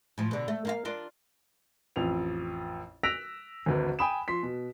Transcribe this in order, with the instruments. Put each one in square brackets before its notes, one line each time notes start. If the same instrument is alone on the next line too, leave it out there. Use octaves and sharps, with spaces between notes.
[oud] A2 F3
B2 D3
A3
A#3 F4 F5
D4 F4 A#4
[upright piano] A1 F2 F7
E6 F#6 A#6 B6 D7 F7
G#1 D2 B4
G5 G#5 B5 D#6 E7
F3 C6 B6
B2